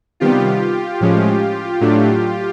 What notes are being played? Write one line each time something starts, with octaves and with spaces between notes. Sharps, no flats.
C3 D#3 G3 B3 F4 G4
A2 F3 G#3 C#4
A2 F#3 A3 D4